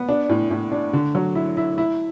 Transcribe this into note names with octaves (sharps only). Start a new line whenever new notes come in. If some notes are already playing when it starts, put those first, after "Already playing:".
Already playing: B3
D4
A2
A2
D4
D3
F#3
E4
E4
E4